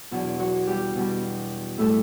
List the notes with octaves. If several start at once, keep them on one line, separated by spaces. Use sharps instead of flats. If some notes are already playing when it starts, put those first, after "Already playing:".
E2 B2 F#3 D4
F#3 F#4
G3 G4
B2 G3
A2 G3 A3 A4